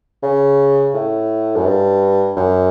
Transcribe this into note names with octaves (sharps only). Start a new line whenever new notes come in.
C#3
A2
F#2
G2
F#2